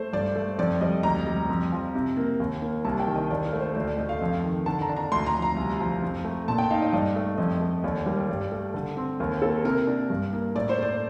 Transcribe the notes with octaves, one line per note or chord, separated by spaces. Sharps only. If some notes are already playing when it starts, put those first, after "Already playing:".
Already playing: A3 C5
G2 D5
A3
F2 D5
G3 D#5
D2 A#5
G3
F2
F3
C3
A#3
D#2
A#3
C2 A5
G5
D#3
D#5
D#2 D5
A#4
A3
C5
D2 D5
D5
A3 D#5
F5
F2
D#3
D3 A5
A#5
D4
A#5
D2 C6
A#5
F3
A#5
C2
F3
F2
A3
A#2 A5
G5
D#4 F5
D#5
G2 D5
A3
F2 D#5
A3
D#2 D5
G3 A#4
G2 D5
A3
D3
C4
D#2 A#4
A#3 A4
C3 A#4
D4
G2
A#3
A2 D5
C5
A3 D5